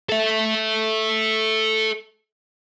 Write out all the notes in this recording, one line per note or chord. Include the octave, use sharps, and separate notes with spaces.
A4 E5